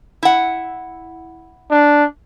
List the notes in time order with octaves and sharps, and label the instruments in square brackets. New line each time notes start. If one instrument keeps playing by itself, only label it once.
[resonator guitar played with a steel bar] E4 F#5
[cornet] D4